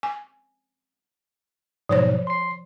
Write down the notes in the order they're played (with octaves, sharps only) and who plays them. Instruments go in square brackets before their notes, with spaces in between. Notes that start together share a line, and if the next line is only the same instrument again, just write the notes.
[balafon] G#5
[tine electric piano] G#2 B2 F#3 [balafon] F3 C5 C#5
[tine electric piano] C6 C7